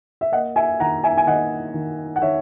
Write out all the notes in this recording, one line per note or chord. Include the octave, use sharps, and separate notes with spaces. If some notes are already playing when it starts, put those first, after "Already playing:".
E5
A#3 D#5 F#5
E5 G#5
D#3 F#5 A#5
E5 G#5
G#5
D#3 D#5 F#5
D#3
F#5
D#3 C#5 E5